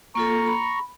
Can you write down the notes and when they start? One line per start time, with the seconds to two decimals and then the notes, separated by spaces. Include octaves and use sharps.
0.15 A#3 F4 A4 A#5 C#6
0.46 B5